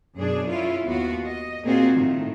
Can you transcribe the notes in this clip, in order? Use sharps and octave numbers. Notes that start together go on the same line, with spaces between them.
F#2 B2 D4 G#4
C#4 E4 F4
D#2 B3 F4 F#4
D#5
A#2 A#3 C4 F4 F#4 G#4
A2 D#3